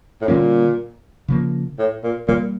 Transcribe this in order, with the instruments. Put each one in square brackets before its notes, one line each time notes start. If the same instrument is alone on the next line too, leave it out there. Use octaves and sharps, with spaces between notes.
[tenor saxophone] A2
[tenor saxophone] A#2 [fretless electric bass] D3 G3 A#3 C#4
[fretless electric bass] C#3 F3 A#3
[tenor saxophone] A2
A#2
[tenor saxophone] A#2 [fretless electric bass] E3 G3 A#3